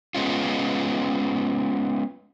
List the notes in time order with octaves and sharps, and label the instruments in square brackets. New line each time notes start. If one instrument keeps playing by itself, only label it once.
[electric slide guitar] G#3 B3 C#4 F4